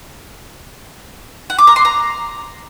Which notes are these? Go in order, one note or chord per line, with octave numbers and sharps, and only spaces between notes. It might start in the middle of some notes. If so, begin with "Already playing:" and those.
F#5
D6
A#5
C6
A#5